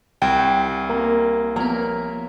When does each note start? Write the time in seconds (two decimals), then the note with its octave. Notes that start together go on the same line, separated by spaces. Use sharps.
0.22 C2 G5
0.89 A#3
1.56 F3 A#3 B3 A#4 C#5 A#5